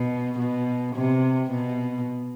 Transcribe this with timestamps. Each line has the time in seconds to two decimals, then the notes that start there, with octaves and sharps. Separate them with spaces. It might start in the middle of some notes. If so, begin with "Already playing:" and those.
Already playing: B2
0.39 B2
0.95 C3
1.51 B2